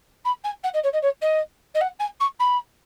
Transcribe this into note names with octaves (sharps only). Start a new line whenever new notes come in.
B5
G#5
F#5
D#5
C#5
D#5
C#5
D#5
D#5
F#5
G#5
C#6
B5